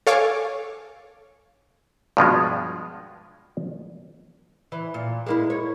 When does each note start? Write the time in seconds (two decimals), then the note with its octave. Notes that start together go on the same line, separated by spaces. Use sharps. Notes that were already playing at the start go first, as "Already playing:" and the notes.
0.07 A4 C#5 F5 G#5 C#6 D6
2.17 G2 B2 F3 G#3
4.72 E3
4.94 A#2
5.26 G#3 A#3 E4
5.50 C#5